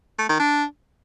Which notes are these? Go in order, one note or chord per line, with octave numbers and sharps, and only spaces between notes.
A3
D#3
D4